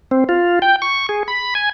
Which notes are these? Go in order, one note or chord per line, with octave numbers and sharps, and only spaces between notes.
C4
F4
G5
C#6
G#4
B5
G#5